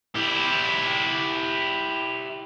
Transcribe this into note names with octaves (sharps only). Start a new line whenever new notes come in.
E4 G4